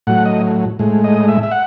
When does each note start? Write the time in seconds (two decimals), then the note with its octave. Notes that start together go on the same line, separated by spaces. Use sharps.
0.07 A2 F#3 F#5
0.25 D#5
0.79 A2 G#3
1.04 D#5
1.28 E5
1.43 E5
1.51 F#5